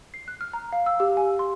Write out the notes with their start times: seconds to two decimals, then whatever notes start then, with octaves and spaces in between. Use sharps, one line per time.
0.14 C7
0.28 F#6
0.41 F6
0.53 A#5
0.73 F5
0.86 E6
1.00 G4
1.17 G#5
1.39 C6